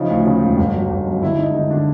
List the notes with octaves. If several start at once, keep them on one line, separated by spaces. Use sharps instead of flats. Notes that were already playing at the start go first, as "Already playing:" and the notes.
Already playing: C#3 F3 C#4 D#4 E4
D2
C#3
E1
G1
F#3
G1
F#2
D3 E4
G#3 D#4
D3 D#4
D3 D4